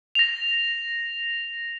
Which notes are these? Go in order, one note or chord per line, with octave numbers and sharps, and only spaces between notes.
A#6 F7